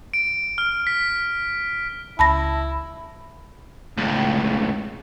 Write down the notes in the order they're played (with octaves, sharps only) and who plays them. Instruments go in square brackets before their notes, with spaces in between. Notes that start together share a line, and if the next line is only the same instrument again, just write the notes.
[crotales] D7
F6
B6
[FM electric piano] C#2 [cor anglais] E4 [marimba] A5 B5 A#6
[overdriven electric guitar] C#2 A2